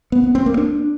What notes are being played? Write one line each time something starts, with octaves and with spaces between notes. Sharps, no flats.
B3
B3
C4
A#3
D4